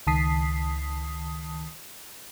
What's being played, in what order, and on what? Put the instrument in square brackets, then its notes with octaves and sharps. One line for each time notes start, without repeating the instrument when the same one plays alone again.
[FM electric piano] C#2 D#3 A5 D#6 B6 C7